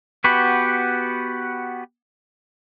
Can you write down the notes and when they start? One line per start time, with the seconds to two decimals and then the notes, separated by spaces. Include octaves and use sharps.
0.24 B3 F#4 G4 B4